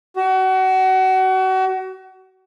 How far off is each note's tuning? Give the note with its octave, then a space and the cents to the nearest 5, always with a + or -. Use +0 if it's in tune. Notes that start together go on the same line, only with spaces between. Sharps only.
F#4 +30